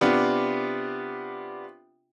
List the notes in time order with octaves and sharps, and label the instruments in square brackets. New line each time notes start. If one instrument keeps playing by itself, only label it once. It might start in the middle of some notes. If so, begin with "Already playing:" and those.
[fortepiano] C3 B3 D4 F4